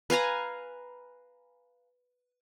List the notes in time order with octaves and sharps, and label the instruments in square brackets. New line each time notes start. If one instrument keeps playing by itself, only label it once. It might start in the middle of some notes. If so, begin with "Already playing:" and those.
[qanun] B4 F5 G#5 A#5